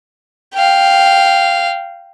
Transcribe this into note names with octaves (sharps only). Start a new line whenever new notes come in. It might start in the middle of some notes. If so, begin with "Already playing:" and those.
F5 G5